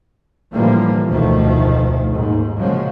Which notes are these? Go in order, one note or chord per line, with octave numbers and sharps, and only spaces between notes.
A2 D3 E3 F3 G3 A#3
F1 D2 B2 D#3 F3 A3
D#2 G#2
A#2 C#3 F3 F#3 G#3